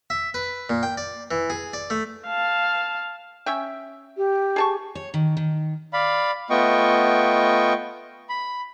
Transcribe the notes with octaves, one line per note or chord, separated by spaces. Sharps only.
E5
B4
A#2
G5
D5
E3
G#4
D5
A3
F5 A5
C#4 E5 G5
G4
G#4 A5 C#6
C#5
D#3
D#3
D5 F5 B5
A3 B3 F4 D#5 G5 C#6
B5